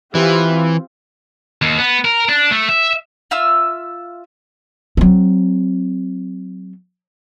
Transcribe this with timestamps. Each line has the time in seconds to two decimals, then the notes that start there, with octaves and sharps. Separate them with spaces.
0.15 E3 C4 F4 G4
1.62 D#2
1.78 B3
2.05 A#4
2.29 D4
2.51 A3
2.69 E5
3.31 F4 E5 E6 F6
4.97 F#3 C4